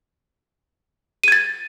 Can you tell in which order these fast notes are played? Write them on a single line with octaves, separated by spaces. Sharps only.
D#7 G#6 A6